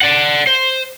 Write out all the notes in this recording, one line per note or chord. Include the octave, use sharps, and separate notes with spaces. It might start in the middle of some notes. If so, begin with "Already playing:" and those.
D5 F#5
C5